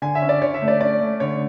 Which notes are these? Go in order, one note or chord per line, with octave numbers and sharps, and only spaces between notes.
D3 G#5
E5
C#4
D5
D3 C#5
E5
A3
D5
C#4 D5
A3
D3 C#5